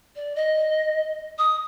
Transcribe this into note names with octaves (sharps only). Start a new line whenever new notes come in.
D5
D#5
D#6